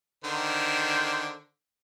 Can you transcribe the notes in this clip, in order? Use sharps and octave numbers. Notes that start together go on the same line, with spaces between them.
D3 D#3 C5